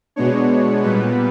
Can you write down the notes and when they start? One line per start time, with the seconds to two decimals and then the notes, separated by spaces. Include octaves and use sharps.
0.16 B2 G#3 B3 D4 C#5
0.82 A#2 G3 B3 B4